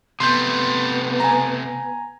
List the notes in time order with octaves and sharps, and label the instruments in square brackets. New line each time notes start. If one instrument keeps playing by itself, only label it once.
[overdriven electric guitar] C3 A3 [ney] B3 [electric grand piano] C6 G6
[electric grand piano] G#5 A#5